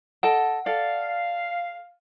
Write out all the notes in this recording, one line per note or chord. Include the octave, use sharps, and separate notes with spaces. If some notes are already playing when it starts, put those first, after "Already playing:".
A4 D#5 F#5 A5
A4 D5 F5